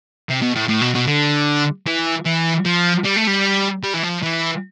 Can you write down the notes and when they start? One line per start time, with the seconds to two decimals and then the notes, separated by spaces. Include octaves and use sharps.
0.29 C3
0.42 B2
0.55 A2
0.69 A2
0.81 B2
0.95 B2
1.08 D3
1.87 E3
2.26 E3
2.66 F3
3.05 G3
3.17 A3
3.27 G3
3.84 G3
3.94 E3
4.03 F3
4.23 E3